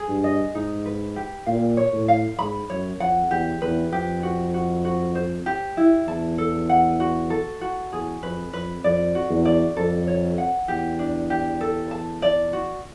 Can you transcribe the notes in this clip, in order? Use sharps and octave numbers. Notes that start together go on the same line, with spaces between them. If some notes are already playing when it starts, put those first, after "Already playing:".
Already playing: G#4
G2
D#5
G#2 D#4
B4
G4
A#2 F5
C#5
A2
F5
G#2 B5
F#2 C#5
F2 F#5
E2 G4
E2 B4
F2 G4
F#4
F#4
F#4
C5
G4
E4
E2 A5
A4
F#5
F#4
A4
F#4
E2 G#4
F2 B4
F2 B4
F2 D5
F#4
E2
D5
F2 A4
C#5
F#5
E2 G4
D4
G4
A4
A5
D5
F#4